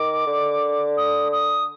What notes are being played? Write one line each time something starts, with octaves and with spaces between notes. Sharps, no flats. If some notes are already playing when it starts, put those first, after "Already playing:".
Already playing: D#3 D6
D3
D#6
D#6